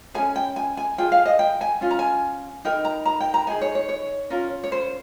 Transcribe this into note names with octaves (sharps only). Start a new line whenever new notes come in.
C#4 G#4 G#5
G5
G#5
G#5
F4 G#4 G5
F5
D#5
G5
G#5
C#4 F4
A#5
G#5
D#4 A#4 G5
A#5
A#5
G5
A#5
D#4 G#4 G#5
C#5
C#5
C#5
C#4 F4 A#4
C#5
C5